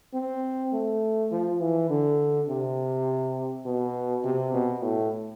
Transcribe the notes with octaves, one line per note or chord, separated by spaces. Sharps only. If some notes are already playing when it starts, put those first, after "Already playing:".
C4
A3
F3
E3
D3
C3
B2
C3
B2
A2